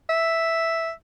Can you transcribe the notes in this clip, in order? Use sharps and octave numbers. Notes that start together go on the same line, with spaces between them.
E5